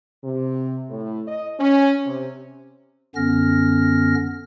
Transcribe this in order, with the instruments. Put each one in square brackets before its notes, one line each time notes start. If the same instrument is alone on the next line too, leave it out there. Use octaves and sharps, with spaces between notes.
[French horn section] C3
A2
D#5
C#4
C3
[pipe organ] F#2 D3 B3 C#4 F6 A#6